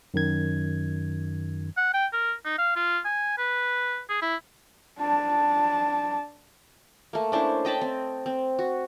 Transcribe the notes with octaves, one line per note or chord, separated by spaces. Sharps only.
F#2 D#3 G#6
F#5
G5
A#4
D#4
F5
F4
G#5
B4
G#4
E4
D4 A5
A3 A#3
C#4 D4 E4 C5
D#5 G5 A5 B5
C4
C4
F#4